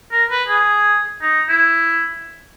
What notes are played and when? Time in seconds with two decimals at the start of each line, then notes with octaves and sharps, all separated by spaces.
0.12 A#4
0.30 B4
0.48 G#4
1.22 D#4
1.49 E4